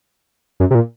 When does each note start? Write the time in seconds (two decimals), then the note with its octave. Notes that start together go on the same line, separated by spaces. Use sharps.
0.60 F#2
0.71 C3
0.75 A#2